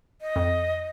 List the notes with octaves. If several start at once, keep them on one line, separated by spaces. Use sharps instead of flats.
D#5
F2